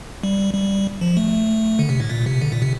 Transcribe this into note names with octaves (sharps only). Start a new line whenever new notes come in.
G3
G3
F3
A3
D3
C3
A2
A#2
C3
D3
A#2
C3